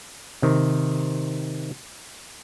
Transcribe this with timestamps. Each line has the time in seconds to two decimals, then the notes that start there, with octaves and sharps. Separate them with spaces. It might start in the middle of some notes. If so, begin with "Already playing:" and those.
0.42 C3 D#3